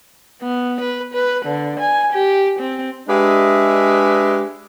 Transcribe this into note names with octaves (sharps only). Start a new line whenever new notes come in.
B3
B4
B4
D3
G#5
G4
C4
G#3 D4 G4 B4 D#5 E5